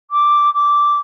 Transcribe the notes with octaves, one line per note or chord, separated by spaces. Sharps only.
D6
D6